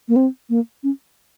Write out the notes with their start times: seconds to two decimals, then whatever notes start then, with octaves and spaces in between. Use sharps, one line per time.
0.09 A#3
0.16 C4
0.50 A#3
0.83 C#4